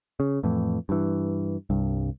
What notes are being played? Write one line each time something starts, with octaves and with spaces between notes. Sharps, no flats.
C#3
F2 A2 E3
G2 E3
C2 G2